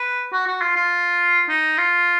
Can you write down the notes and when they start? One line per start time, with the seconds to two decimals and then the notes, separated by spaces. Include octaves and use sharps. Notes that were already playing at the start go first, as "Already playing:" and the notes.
Already playing: B4
0.33 F#4
0.47 F#4
0.61 F4
0.76 F4
1.49 D#4
1.78 F4